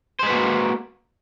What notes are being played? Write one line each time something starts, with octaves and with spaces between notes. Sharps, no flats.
G#3 A#3 F#4 B4 C5